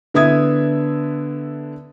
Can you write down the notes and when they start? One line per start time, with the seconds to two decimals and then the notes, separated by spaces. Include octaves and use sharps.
0.14 D3 B3 E4 E5 D#6 G#6